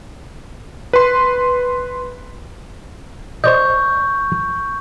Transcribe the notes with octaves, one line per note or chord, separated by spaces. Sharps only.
B4 C6
C5 D5 D#5 C#6 G6